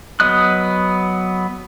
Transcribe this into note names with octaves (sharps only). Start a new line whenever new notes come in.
F#3 B3 D#5 D#6 F#6